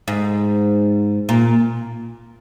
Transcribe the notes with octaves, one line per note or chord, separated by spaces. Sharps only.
G#2
A#2